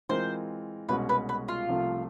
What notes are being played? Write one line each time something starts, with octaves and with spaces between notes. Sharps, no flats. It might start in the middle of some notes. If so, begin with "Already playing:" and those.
E3 G#3 C4 F4 A#4 C5
C2 B2 G#3 C#4 F#4 B4
B4
B4
F4
C2 C3 F3 A3